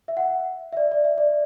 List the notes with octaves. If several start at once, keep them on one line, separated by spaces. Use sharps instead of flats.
E5
F#5
E5
D5
D5
E5
D5